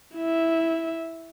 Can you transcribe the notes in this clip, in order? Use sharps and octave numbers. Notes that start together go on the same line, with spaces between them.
E4 E5